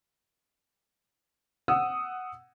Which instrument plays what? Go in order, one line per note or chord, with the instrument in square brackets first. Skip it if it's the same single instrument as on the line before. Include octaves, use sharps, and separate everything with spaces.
[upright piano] F#5 D#6 E6